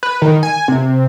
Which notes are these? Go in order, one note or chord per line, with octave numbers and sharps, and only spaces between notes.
B4
D#3
G#5
C3